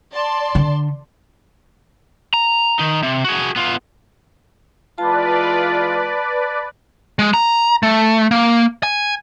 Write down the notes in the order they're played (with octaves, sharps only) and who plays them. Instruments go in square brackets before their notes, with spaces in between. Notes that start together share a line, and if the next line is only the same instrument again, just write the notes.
[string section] D5 A5 C6
[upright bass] D3
[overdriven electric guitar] A#5
D#3 D#4
C3
F#4 G#4
B3 F4
[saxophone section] E3 G#3 F4 [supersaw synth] B4 D5 [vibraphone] A5
[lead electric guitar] G#3
A#5
A3
A#3
G#5